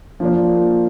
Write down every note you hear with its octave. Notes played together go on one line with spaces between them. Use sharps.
F3 A#3 D4